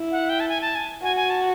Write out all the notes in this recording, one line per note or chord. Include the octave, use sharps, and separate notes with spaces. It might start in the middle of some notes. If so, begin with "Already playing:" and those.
Already playing: E4
F#5
G5
A5
G#5
A5
G#5
F#4 G#5
G#5
A5